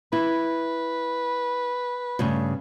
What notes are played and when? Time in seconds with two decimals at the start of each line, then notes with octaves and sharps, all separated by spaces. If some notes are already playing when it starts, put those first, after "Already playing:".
0.13 E4 B4
2.19 G2 C#3 A3